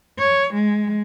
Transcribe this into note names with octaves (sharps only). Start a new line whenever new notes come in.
C#5
G#3